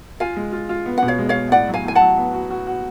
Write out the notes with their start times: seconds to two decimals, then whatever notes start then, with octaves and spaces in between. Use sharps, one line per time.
0.20 F4 F5 G#5
0.37 G#3
0.53 F4
0.69 F4
0.86 B3
0.98 B2 F#5
1.08 C#5 F5
1.19 G#3
1.29 C#5 F5
1.36 G#3
1.52 A2 D5 F#5
1.68 F#3
1.74 F5 G#5
1.84 A2 G#5
1.95 F#5 A5
2.01 F#3
2.17 B3
2.34 F#4
2.50 F#4
2.67 F#4